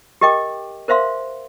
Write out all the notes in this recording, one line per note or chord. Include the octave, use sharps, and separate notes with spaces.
G4 A#4 D#5 G5 D6
A#4 C5 E5 F5 C6